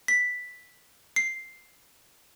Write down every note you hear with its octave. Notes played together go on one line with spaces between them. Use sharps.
B6
C7